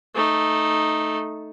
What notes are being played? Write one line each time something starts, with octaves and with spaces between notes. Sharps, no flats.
A3 D#4